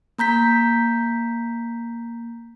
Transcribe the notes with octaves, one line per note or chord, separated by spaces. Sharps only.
A#3 A#5 G6 B6